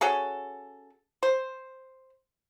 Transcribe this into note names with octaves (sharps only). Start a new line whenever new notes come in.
C#4 F#4 G#4 A4
C5